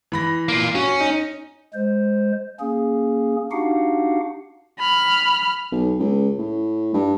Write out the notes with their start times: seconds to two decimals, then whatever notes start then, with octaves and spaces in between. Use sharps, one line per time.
0.12 E3 B5 A#6
0.48 A#3 F4
0.75 C#4 F#4
1.00 D#4
1.74 G#3 C5
2.60 A#3 C#4 G#4
3.51 D4 D#4 F#4 G4 F5 F#5
4.79 B5 F6
5.72 B1
5.99 C#2
6.38 A2
6.94 G2